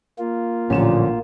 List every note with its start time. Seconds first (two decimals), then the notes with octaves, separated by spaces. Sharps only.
0.19 A#3 F4
0.70 A1 A#2 D3 F3 C#4 E7